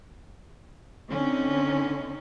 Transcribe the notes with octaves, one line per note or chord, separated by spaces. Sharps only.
D3 C4 C#4 D#4